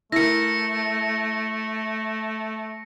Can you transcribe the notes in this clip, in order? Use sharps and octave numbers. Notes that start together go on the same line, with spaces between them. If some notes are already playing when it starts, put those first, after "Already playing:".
A3 E4 A#4 A#6 C#7